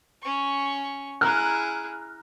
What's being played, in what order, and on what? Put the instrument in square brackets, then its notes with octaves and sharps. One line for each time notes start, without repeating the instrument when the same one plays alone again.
[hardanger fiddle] C#4 C#6
[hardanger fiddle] E4 G#4 [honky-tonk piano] A#5 F6 F#6